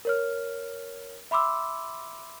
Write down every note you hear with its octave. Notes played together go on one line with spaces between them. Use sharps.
A#4 C#5 F6
E5 B5 C6 D6 E6